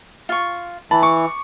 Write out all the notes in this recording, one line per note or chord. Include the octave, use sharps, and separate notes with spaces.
F4 C#6
E3 A5 B5
C#6 D6